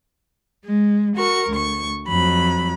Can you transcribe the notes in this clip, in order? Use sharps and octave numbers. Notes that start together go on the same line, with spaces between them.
G#3
F#4 A#4 C#6
D2 C#6
F2 F#3 B5